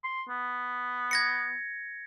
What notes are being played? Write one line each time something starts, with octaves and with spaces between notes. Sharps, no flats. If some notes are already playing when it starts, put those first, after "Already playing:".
C6
B3
G#6 A#6 C#7